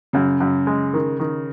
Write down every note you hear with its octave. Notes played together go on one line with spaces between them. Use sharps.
F#2 C#3
F#2
G#3
D#3
D#3